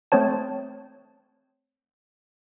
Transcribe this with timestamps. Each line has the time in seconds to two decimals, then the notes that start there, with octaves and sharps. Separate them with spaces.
0.12 A3 C4 C5 C#5 A5